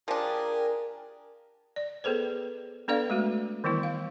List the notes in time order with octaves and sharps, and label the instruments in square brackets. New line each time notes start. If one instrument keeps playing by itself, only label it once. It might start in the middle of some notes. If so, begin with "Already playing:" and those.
[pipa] F3 D4 [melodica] G4 G#4 G#5 [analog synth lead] A#4 [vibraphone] D5 G5
[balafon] D5
B3 G#4 A4 B4 C5
B3 D4 A4 B4 D5 F5
G#3 A3 F#4
D#3 E3 G3 B3 E4
F5